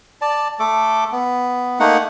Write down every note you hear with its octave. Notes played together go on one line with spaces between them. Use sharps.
D5 A5
A3 A4 D6
B3
A3 A#3 D#4 F#5